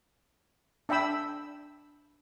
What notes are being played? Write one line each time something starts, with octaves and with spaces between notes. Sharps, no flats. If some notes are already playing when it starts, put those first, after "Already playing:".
D4 E5 G5 B5 E6